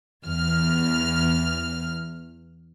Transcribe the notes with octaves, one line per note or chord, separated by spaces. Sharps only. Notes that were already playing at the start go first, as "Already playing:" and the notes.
E2 F6